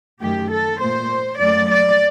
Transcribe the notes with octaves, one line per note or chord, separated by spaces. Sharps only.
F#2 D#3 A3 G4
A4
A#2 A3 C5
F#2 F#3 A3 D5
D5